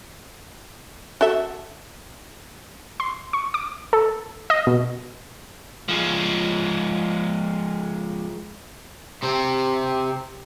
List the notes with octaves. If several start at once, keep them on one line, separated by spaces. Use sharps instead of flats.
F#4 A4 E5
C6
C#6
D6
A4
D#5
B2
F3 G#3
C3 C4